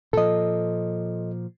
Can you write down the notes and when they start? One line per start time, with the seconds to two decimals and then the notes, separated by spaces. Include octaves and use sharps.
0.13 A#2 F3 A4 D#5